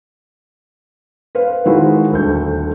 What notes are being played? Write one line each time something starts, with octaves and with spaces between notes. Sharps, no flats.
B4 C5 F5
D#3 G#3 E4 F#4 C5
D#1 D2 A4 G6